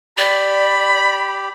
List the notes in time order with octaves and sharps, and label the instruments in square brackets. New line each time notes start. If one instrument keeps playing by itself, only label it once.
[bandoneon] G4 [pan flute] D5 [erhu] B5